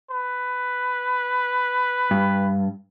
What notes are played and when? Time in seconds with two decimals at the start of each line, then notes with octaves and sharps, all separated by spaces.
0.11 B4
2.11 G2